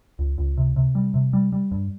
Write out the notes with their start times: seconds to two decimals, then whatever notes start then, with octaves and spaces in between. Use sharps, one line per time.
0.19 C#2
0.38 C#2
0.57 C3
0.76 C3
0.95 G3
1.14 C3
1.33 G3
1.52 G3
1.72 G2